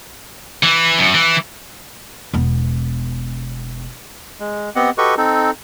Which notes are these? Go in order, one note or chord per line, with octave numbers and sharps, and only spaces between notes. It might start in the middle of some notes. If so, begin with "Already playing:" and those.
E3
F#2
E3
E1 B3
G#3
B3 C4 G4 D#5 F#5
F#4 G4 A4 B4 D#5 C#6
C4 D#4 A4